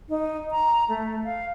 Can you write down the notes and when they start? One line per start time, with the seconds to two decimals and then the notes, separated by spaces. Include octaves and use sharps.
0.09 D#4
0.51 A#5
0.89 A3
1.24 F5